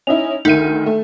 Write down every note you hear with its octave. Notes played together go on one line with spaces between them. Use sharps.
C#4 D#4 E4 F7
D2 D#3 D#4 E5 D#7
A3